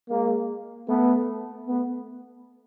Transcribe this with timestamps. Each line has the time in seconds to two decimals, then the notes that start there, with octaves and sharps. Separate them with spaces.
0.09 G#3 A#3
0.88 A3 B3
1.68 A3 B3